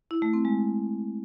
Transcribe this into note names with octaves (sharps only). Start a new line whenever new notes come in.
E4
A3
C4
G#3